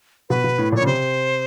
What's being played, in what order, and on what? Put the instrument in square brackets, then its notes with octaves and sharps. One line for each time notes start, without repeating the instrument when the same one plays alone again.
[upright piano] B2 [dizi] B4
[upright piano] B2
A2
[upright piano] A#2 [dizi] C#5
[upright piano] C#3
[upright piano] C3 [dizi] C5